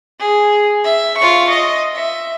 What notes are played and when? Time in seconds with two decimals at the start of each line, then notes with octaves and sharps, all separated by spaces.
0.20 G#4
0.84 E5
1.17 F4 C#6
1.50 D#5
1.93 E5